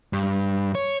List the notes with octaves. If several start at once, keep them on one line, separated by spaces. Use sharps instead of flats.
G2
C#5